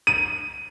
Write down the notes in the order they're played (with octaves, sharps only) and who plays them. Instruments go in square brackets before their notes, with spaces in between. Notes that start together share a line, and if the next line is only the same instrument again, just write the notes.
[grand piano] D#7